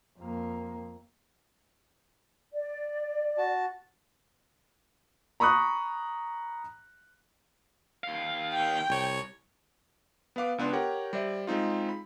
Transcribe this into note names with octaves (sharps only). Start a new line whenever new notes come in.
F2 A#3
D5
F#4 A5
A#5 B5 C#6 D#6 F#6
D#2 F5
G5
C2 C#5
B3 B4 F5 D6
C#2 B3 D4 C6
G4 A#4 C#5 F#5 G5
G3 C5 D5 E5
G#3 C4 D#4 F4
B5